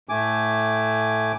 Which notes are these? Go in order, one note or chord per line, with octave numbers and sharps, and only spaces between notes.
A2 A3 G#5 D6